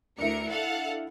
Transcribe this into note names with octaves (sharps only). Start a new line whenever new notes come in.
D2 D4 E4 A#4 C#7
A4 F5 F#5